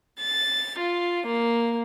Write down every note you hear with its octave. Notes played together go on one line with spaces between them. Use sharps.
A6
F4
A#3